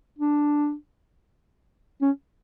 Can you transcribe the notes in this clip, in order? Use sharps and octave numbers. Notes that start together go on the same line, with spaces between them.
D4
C#4